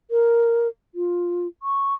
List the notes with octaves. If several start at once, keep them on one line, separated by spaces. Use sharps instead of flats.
A#4
F4
C#6